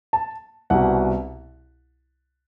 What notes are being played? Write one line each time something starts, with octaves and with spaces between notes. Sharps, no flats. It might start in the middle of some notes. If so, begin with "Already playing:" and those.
A5
C2 B2 F#5